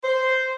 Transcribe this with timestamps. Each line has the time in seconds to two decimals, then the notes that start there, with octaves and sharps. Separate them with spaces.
0.04 C5